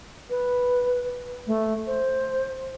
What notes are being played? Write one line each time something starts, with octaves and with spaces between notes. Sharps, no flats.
B4
A3
C5